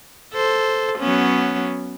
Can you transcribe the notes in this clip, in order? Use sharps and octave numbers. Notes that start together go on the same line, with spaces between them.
A4 C5
F#3 B3 C#4